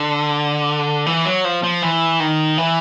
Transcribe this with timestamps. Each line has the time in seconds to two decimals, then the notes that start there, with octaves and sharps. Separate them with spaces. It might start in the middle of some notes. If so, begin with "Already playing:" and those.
Already playing: D3
1.06 E3
1.25 F#3
1.45 F3
1.63 F3
1.82 E3
2.20 D#3
2.58 E3